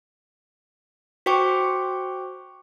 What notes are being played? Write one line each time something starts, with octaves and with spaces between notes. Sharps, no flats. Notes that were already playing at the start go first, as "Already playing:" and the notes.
F#4 C5 G5 C#6 D6